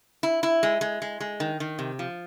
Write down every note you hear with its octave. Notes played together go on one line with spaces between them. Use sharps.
E4
E4
G#3
G#3
G#3
G#3
D#3
D#3
C3
F3